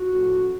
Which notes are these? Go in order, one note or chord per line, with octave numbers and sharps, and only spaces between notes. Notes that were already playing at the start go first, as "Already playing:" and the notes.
Already playing: F#4
A2 F3 A3 C#4